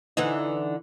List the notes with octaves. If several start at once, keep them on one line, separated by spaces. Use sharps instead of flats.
D3 E3 D#4